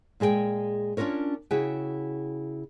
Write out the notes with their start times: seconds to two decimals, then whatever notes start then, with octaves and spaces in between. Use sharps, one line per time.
0.20 A#2 G#3 G#4 D5 G5
0.97 C#4 D4 F4 A#4 C#5
1.51 C#3 E4 F#4 G#4 F#5 G5